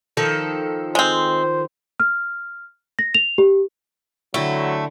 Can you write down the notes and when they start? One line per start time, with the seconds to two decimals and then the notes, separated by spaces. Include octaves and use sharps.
0.17 D#3 F3 A4
0.95 G#3 C4 C5
2.00 F6
2.99 A#6
3.15 F7
3.38 G4
4.34 D3 F#3 A3 E4 G5